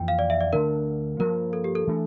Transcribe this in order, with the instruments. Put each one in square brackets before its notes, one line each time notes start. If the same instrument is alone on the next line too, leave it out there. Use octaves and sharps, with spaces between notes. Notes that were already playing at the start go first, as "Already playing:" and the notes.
Already playing: [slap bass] F2 E3 A#3 [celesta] G5
[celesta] F5
D5
E5
D5
[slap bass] D2 D3 A3 D4 [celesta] A#4
[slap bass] G2 F3 A#3 [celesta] A#4
[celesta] A4
G4
A4
[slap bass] E3 A3 D4